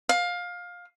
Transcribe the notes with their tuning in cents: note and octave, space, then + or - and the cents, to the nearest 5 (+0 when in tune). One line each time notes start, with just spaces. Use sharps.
F5 +20